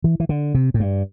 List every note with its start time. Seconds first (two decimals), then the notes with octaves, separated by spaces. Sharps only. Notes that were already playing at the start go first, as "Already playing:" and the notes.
0.04 E3
0.20 E3
0.29 D3
0.54 C3
0.74 A2
0.80 G2